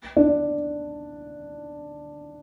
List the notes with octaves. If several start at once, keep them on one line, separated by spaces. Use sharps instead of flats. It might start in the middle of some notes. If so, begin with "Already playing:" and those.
D4